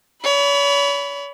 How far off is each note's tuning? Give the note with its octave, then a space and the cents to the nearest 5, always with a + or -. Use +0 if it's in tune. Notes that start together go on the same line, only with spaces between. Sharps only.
C#5 +40 B5 +0